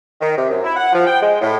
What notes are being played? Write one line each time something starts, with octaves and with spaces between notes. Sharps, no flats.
D#3
C3
F#2
E4
F#5
F3
G5
G#3
A2